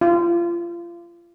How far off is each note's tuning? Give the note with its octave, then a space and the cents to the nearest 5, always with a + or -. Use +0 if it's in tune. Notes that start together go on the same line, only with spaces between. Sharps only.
F4 -30